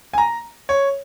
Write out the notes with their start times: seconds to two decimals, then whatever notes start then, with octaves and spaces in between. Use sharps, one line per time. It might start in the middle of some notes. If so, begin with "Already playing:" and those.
0.13 G#5
0.18 A#5
0.69 C#5